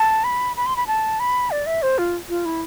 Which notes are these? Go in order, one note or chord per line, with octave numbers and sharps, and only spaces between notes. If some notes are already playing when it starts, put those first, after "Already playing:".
Already playing: A5
B5
B5
C6
B5
A5
B5
D5
E5
C5
F4
F4
E4